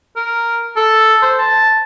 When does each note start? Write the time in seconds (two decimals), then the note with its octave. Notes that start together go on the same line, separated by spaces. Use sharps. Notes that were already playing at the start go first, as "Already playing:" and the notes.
0.16 A#4
0.77 A4
1.22 C5
1.39 A5